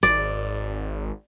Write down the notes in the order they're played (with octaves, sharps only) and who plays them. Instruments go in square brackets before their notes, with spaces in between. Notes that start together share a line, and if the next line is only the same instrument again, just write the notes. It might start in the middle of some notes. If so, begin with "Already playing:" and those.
[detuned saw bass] G#1 [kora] D5